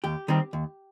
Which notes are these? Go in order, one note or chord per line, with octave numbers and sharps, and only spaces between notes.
D#2 G4
D#3 G3 C4
D#2